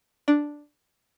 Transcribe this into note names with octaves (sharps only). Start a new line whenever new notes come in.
D4